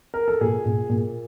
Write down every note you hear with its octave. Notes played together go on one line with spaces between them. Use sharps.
A#4
A4
A#2 G#4
A#2
A#2